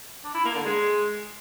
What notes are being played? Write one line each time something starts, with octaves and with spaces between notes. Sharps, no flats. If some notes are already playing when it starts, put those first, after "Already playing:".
D4
E4
A#3
D3
G#3